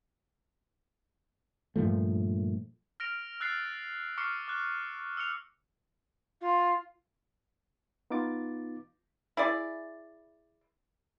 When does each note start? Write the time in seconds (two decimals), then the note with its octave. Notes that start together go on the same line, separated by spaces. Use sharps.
1.76 G2 A#2 F3 A3
3.00 F6 A#6 D7 F7
3.40 E6 F#6 A6 C7
4.18 C#6 D6 F6 C7 C#7
4.48 D6 F#6
5.17 E6 F6 C#7 F7
6.41 F4
8.10 B3 D#4 F4 D6 A6
9.37 E4 G#4 D5